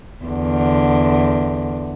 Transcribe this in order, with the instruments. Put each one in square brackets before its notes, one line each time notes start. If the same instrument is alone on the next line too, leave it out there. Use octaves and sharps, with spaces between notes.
[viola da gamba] E2 D3